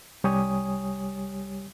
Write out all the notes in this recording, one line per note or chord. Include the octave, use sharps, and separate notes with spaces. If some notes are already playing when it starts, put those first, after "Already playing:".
C2 G3 G4 C#5 G#5 D#6